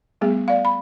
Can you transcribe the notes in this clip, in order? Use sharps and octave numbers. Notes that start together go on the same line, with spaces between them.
G3 A3 B3 G#4
D5 F5
B5